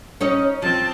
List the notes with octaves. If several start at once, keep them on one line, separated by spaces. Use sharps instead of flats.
C#4 D#4 D#5
F3 C4 A5